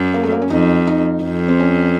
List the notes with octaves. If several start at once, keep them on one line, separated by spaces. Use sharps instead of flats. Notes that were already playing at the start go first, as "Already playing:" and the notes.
Already playing: F#2
A#3
A3
A#3
C#4
F2 D#4
D#4
F2
C4
C#4